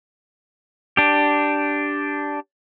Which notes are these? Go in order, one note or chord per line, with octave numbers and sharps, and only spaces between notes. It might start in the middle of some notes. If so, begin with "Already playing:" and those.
D4 G4